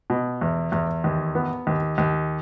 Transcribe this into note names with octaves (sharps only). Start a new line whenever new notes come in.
B2
E2
E2
D#2
B3
D#2
D#2